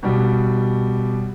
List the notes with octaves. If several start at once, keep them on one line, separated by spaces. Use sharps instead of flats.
B2 G3